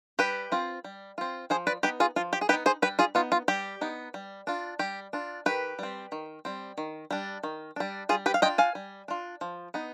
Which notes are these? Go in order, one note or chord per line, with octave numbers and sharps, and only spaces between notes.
G3 G4 B4
C4 F4
G3
C4 F4
F3 G#4 C5
B4 D5
B3 D#4 G4 B4
F4 G#4
F3 F4
G4
G#4
B3 D#4 G4 B4
G#4 C5
G3 G4 B4
F4 G#4
B3 D#4 F4
F4
G3 G4
B3 D#4
G3
D4 F4
G3 G4
D4 F4
D#3 G4 B4
G3 C4
D#3
G3 C4
D#3
G3 D4
D#3
G3 D4
G3 F4 G#4
G4 B4
F5
D4 F4 D#5 G5
F5 G#5
G3
D4 F4
F3
B3 D#4